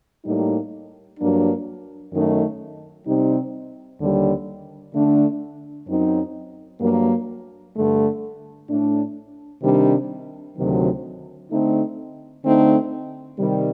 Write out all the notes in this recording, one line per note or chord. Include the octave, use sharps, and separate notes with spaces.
A2 G3 A#3 D#4
G2 F#3 A#3 D4
F#2 D#3 A3 D#4
C3 G3 C4 D#4
D#2 D3 G3
D3 A3 D4
F#2 F#3 C4 D#4
G2 F#3 A#3
G2 D3 A3
A2 A3 D4
C3 D#3 G3 D4
D2 C3 D#3 F#3
D3 A3 C4 D#4
D3 A3 C4 D#4
C3 D#3 G3